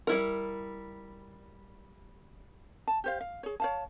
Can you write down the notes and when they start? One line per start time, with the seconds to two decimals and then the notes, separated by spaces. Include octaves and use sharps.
0.07 G3 E4 A#4
2.88 A5
3.04 G4 C5 F5
3.21 F5
3.43 G#4 C#5
3.60 C#5 F5 A5